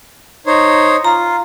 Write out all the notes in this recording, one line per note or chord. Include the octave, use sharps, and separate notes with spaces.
D#4 C5 C#5
F4 A#5